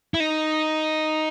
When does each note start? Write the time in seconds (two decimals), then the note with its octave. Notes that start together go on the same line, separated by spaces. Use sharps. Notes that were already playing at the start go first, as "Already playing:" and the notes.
0.14 E4
0.20 D#4